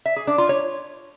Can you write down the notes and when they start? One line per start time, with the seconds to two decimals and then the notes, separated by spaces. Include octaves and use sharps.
0.06 E5
0.16 G#4
0.27 D4
0.38 F4
0.49 C#5